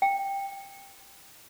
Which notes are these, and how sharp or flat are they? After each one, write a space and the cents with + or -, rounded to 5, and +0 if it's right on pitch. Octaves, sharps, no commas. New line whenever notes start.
G5 +10